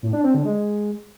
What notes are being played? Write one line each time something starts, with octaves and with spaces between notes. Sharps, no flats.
A2
D4
C4
D3
G#3